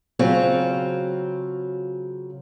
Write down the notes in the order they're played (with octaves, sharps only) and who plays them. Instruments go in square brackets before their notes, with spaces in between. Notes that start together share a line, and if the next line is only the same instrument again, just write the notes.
[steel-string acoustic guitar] C#3 F#3 C4 F4